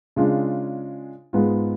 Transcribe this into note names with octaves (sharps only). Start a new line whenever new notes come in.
C#3 G#3 D4 F4
G#2 G#3 B3 F4